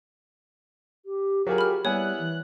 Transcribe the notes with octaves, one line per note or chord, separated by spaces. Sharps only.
G4
F#3 F4 G4 G#4 A#4
B5 F6
G3 B3 E4 C#5 G#5 F#6
E3